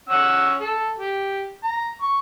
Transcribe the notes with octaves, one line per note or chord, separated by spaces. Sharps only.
C#4 F#5 E6
A4
G4
A#5
C#6